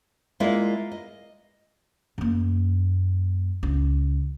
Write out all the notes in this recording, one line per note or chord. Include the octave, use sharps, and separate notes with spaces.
G#3 A#3 E4 F4 D5 E5
D#5
F#2 A#3
C#2